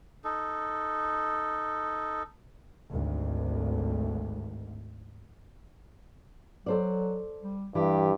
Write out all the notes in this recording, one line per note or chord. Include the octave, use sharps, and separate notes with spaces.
D#4 A4
G#1 D2
F#3 A4 C5 D5
G3
G2 E3 G4